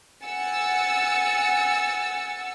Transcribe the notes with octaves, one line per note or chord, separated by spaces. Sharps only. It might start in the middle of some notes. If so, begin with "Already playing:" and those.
F#5 G#5 E6 A6 C#7